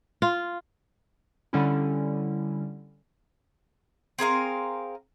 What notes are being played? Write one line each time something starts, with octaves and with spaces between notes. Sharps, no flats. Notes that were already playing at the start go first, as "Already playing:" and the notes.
F4
D3 G3 C#4 E4
C4 G#4 A#4 F5